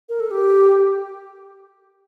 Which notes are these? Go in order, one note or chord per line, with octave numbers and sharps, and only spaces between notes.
A#4
A4
G4